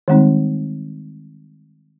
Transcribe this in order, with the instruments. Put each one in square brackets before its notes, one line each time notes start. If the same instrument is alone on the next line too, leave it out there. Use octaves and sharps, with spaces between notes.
[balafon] D#3 G3 G#3 C4 D#4